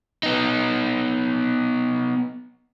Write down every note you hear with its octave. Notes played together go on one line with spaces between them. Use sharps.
B3 D#4